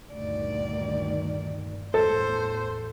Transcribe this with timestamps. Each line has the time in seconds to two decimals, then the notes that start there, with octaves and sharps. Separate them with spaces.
0.13 D2 G2 A#2 D#3 D5
1.94 E2 A2 A4 C5